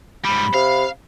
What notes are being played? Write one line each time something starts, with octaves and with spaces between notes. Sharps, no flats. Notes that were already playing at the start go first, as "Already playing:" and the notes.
G#2 G3 B5
C3 F5